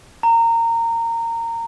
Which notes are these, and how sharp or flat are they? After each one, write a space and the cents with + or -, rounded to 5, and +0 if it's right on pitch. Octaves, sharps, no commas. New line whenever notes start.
A#5 -20